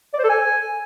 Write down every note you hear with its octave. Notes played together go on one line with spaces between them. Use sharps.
D5
C5
A4
G#5